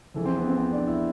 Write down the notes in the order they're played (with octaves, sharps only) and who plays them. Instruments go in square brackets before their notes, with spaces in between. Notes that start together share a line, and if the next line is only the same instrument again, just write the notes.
[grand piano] F2 E3 G#3 A4
C4
B3
C4
C4
D4
E4